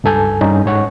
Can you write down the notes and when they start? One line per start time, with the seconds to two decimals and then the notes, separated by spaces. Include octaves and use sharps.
0.04 C#2 G2 A4 G#5 G6
0.41 G2 C#4 D#4
0.66 G#2 C#5 F#5 C#6